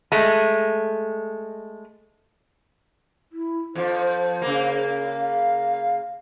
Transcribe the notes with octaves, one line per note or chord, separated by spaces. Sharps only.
G#3 A3
E4
F2 F3 C5
C#3 A#3
F5